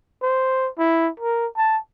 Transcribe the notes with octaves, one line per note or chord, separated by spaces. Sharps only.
C5
E4
A#4
A5